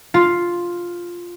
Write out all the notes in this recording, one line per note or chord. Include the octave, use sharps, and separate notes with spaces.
F4